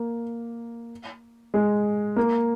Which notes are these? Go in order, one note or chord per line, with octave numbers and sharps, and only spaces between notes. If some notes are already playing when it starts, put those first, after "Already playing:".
Already playing: A#3
G#3
A#3